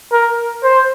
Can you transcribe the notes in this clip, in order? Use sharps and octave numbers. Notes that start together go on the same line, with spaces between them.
A#4
C5